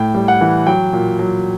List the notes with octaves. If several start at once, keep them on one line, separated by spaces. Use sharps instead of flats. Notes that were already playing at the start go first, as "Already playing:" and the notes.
Already playing: A2 G5
G3
F#5
E3
F#3 G5
A#2
F#3